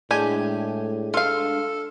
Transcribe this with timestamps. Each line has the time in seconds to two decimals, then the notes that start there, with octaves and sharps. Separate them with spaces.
0.11 A2 G#3 D4 G4 G#5
1.14 F4 A4 F5